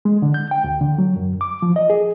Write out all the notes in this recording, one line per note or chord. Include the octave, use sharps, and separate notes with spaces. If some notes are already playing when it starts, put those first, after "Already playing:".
G#3
D3
G6
G5
D2
D3
F#3
F#2
D6
F3
D#5
G#4